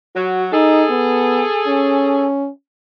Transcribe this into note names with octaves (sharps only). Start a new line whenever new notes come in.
F#3 F#4
D#4 G#4 A4
B3
C#4